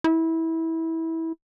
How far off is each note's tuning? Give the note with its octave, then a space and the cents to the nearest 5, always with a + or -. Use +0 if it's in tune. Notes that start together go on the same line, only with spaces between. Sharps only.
E4 -20